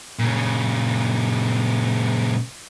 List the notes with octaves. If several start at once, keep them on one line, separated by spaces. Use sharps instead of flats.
A#2 C#3